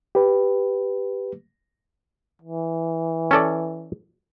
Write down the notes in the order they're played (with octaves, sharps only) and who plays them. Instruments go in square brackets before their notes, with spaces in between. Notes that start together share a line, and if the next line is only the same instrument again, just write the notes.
[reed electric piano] G4 B4
[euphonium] E3
[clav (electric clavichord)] C#4 A4 D5